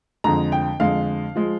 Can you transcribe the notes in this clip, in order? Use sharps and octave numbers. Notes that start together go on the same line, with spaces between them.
F2 D3 G#3 A#5
G5
F2 D3 G#3 F5
F3 G#3